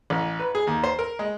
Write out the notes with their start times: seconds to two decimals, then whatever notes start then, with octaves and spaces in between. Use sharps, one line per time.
0.10 A1
0.40 B4
0.55 G#4
0.67 D#2
0.83 C5
0.99 A#4
1.19 G#3